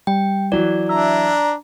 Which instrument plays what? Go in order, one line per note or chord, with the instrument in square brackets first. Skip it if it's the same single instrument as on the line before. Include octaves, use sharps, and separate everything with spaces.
[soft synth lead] G3 [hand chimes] G5
[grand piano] E3 F#3 [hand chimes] D5
[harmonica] D4 A#5 [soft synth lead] E5